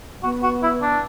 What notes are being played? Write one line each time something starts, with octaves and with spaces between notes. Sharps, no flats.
B3 F#4
F#4
E4
D4